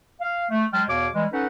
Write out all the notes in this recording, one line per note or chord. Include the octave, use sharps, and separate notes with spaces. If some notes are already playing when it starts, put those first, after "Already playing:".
F5
A3
F#3 G#3 G5 A5 F6
E2 B2 C#5 F5 D6
E3 G3 G#3
C#4 D#4 A4 B4 F#5